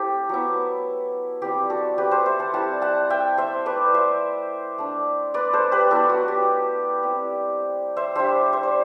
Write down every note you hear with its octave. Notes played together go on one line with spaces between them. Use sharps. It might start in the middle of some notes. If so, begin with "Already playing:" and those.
Already playing: A3 C4 E4 G4 A4
F#3 B3 E4
G3 C4 E4 G4
F#4 A4
G4 B4
A4 C5
C5 E5
F#5 A5
G3 C4 E4 F#5 A5
F#5 A5
E5 G5
C5 E5
A3 E4 B4 D5
C5 E5
A3 D4
B4 D5
A4 C5
G4 B4
F#3 B3 E4 F#4 A4
F#4
G4
G3 C4 E4
C5 E5
G3 D4 C5 E5
C5 E5
C5